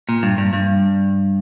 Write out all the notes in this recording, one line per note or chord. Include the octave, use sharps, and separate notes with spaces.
A#2
G2
G2
G2